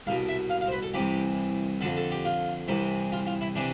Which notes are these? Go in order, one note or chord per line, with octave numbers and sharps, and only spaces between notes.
C2 B2 F5
E5
F5
F5
C5
B4
A4
C2 C3 E3 G4
F2 D3 A4
A4
G4
F4
C2 C3 E3
F4
F4
E4
C3 E3 D4